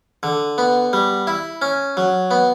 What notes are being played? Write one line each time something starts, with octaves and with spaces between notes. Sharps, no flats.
D3
B3
G3
E4
C#4
F#3
B3